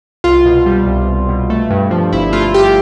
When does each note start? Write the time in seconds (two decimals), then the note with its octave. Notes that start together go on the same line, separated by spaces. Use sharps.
0.24 C2 F4
0.45 B2
0.66 G3
0.87 C2
1.07 C2
1.29 B2
1.50 A3
1.70 G2
1.91 F3
2.13 G1 E4
2.33 A3 F4
2.54 G2 G4